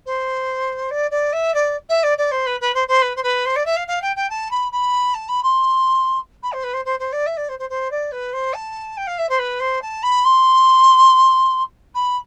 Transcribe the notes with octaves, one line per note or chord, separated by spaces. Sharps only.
C5
D5
D5
E5
D5
E5
D5
D5
C5
B4
B4
C5
C5
B4
C5
B4
C5
D5
E5
F5
F5
G5
G5
A5
B5
B5
A5
B5
C6
B5
C5
B4
C5
C5
C5
D5
E5
D5
C5
C5
C5
D5
B4
C5
A5
G5
F5
E5
C5
B4
C5
A5
B5
C6
B5